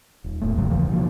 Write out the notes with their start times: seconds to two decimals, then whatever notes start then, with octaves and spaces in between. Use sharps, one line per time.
0.24 D#1
0.41 D#1 A2 A3
0.56 A#1 G2 C#3 F#3
0.71 D#2 C#3 E3 F3
0.91 B2 D#3 F3 A#3